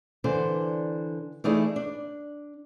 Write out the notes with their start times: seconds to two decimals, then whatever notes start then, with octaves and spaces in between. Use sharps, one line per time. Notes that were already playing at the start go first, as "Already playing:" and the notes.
0.24 D3 E3 D4 C5
1.44 E3 A3 D#4 E4 G#4 D5
1.76 D4